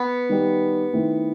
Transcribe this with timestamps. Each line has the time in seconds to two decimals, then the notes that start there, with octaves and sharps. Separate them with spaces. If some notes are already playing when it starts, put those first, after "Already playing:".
Already playing: B3
0.29 D#3 G3 D#4 G4
0.93 D#3 A3 C4 E4